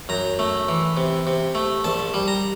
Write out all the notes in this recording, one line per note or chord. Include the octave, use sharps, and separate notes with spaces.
F#2 A#5
A3
E3
C3
C3
A3
A#1 A5
G3
A#5